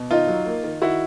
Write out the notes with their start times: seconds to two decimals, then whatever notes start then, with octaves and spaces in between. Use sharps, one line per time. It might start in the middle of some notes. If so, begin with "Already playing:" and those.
Already playing: B2
0.11 D#3 D#4 F4
0.28 F#3
0.46 A#3
0.64 D#3
0.82 D#3 E4 F#4